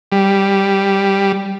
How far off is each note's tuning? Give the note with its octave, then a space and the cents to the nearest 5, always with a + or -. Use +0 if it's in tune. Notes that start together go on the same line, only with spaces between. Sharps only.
G3 +0